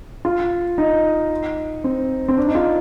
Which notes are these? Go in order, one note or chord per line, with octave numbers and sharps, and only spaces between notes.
F4
D#4
C4
C4
D4
D#4
F4